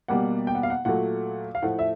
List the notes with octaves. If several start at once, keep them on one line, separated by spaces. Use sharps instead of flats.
B2 G3 A#3 F#5
G5
F#5
F5
F#5
A#2 F#3 A3 F#5
F5
A2 F3 A3 F#5
E5